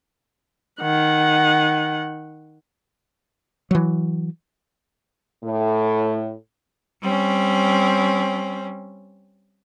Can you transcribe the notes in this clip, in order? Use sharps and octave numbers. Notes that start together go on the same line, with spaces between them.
D#3 F#5
E3 F#3
A2
G3 C4 C#4